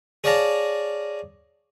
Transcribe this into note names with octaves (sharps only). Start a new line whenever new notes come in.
G#4 C#5 D5 F5 A5 A#5